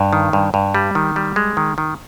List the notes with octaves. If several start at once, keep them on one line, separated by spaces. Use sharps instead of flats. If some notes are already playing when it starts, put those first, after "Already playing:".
Already playing: G2
D#3
G2
G2
G3
D#3
G3
G#3
D#3
D#3